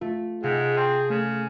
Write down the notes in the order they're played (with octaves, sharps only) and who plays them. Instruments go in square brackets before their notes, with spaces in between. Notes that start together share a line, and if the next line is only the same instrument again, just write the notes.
[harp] A3 [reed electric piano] F4
[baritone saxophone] G#2 [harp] C3 F5 A#6 [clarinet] G#4
[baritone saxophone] C4 [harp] A5
[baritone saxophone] C#3 [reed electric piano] A3